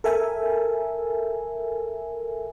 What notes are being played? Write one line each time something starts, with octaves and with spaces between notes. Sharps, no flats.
A4 A#4 E5 G#5